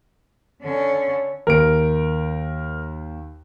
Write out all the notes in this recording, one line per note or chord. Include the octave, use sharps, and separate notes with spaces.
D3 C#4
D#2 A#4 D7